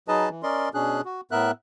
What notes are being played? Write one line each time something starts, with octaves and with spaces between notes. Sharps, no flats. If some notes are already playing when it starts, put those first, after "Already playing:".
F#3 D#4 G#4 B4 D#5 A5
E3
C#4 A#4 D5 D#5 C6
B2 C#4 D4 G#4 F#6
F#4
A2 B3 A#4 E5 F#6